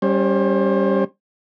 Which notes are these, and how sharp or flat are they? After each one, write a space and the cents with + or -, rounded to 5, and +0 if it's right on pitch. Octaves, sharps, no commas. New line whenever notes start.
G3 +0 C#4 -5 C5 +30